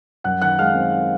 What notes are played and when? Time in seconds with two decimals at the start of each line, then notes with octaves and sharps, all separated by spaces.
0.24 F#2 F#5 F#6
0.42 D#3 F#5 F#6
0.59 G#3 F5 F6
0.75 C4